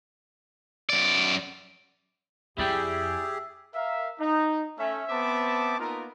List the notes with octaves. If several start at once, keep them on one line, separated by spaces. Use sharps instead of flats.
F#2 D5
F2 E4 G4 G#4 D5 E5 G5
A#4 E5 F5
D#4
A3 C#4 E5
B3 C4 C5 E5 A5 D6
A#3 B3 D#4 F4 A#4